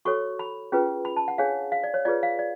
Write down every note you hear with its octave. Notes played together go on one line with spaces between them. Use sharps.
F#4 A4 C#5 C#6
B5
C#4 F4 G#4 B4
B5
A5
F#5
D4 G#4 C#5 F5
F5
D5
C#5
F4 G#4 B4 D5
F5
D5